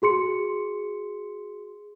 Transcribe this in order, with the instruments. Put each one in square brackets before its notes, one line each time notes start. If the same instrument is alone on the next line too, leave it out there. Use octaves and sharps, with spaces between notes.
[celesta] F#4 G#4 C6 C#7